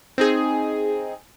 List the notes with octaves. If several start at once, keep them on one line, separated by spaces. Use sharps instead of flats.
C4 D#4 G#4